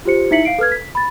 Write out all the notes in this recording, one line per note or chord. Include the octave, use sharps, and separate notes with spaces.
F4 G4 C5 C#7
D#4 E4 E5 B6 C#7 F#7
F5 C7 D7
A4 B4 F6 G#6
B6
B5 A6